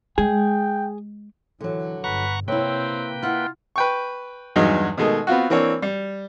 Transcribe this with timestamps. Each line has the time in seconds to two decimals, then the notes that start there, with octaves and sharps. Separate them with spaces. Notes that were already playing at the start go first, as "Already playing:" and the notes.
0.18 G#3 G#4 G5
1.61 D3 E3 F#3
2.04 G1 B4 F#5 A#5 C#6
2.48 C3 A#3 C4 E4 B4 C#5 G5
3.23 E4 F4 F#5
3.76 B4 G5 C#6
4.56 E2 G2 F#3 G#3 D#4
4.98 B2 D#3 G#3 A3
5.27 B3 C4 F4 F#4
5.50 E3 A#3 C4 D4 C#5
5.82 G3